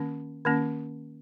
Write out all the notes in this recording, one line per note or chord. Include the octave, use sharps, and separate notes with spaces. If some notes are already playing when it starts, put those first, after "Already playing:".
Already playing: D#3 A#3 C#4
D#3 A#3 C#4